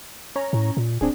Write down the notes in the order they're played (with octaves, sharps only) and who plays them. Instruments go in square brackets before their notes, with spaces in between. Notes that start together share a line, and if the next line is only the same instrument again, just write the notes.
[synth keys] C#4 C#5 A#5
[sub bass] A2
A#2
[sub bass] D1 [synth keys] C4 D4 G#4